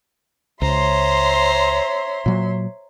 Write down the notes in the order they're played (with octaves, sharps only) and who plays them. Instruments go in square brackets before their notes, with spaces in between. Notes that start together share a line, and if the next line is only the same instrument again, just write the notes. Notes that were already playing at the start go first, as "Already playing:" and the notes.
[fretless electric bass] C#2 [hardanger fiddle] C5 A#5 [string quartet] C#5 E5 C6
[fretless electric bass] A#2 F#3